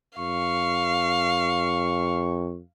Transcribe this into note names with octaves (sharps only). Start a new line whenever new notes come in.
F2 F5 C#6